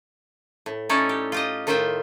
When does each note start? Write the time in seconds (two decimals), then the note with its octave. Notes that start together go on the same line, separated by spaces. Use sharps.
0.66 A2
0.89 C#4 D#4 E4 A4 C#5 D5
1.09 G4
1.32 F4 G4 D#5
1.67 A2 D#3 F4 C5 E5 G5